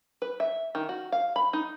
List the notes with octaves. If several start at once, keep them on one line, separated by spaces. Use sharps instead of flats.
B4
E5
D#3
F#4
F5
B5
D#4